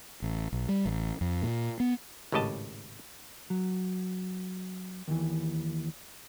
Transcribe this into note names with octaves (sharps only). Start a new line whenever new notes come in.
A1
B1
G3
A1
F2
A#2
B3
G#1 A2 C#3 G4 D#5 A5
F#3
D#2 E3